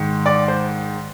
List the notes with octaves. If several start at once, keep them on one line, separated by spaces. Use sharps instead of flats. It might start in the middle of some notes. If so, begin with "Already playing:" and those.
Already playing: G#2 D#3
D5
C5